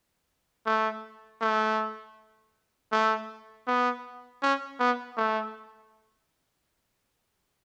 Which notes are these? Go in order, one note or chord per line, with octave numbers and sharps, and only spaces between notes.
A3
A3
A3
B3
C#4
B3
A3